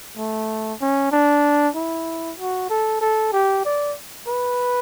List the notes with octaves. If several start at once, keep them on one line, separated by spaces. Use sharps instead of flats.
A3
C#4
D4
E4
F#4
A4
A4
G4
D5
B4